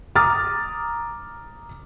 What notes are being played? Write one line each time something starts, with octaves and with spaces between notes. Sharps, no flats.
A#5 D6 D#6 F6 A6